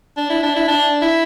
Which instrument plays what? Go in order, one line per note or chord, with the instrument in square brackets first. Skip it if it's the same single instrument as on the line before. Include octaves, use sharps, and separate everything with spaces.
[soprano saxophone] D4
E4
D4
E4
D4
E4